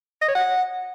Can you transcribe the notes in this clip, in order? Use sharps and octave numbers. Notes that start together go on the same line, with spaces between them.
D#5
C#5
F#5